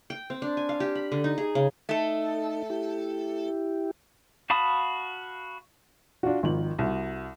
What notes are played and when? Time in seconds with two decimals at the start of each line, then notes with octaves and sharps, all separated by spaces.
0.10 G5
0.30 C4
0.42 D4
0.57 G#5
0.69 F5
0.80 G4
0.95 B5
1.12 D3
1.24 D#4
1.38 G#4
1.55 C#3
1.89 A3 D#4 A4
2.70 E4 G4
4.50 F#4 F5 A5 B5 D#6
6.23 D4 F4 F#4
6.43 G#1 D#3 F3 F#7
6.78 C2 F#4